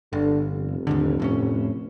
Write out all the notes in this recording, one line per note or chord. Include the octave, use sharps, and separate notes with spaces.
G1 D3
F1
D#2 G#2 D3
F2 A2 C#4